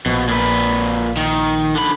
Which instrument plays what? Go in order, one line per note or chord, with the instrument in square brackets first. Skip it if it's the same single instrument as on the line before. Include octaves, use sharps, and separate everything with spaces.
[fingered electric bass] A#1 [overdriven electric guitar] B2
[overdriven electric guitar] A#2 B4
D#3
D3 B5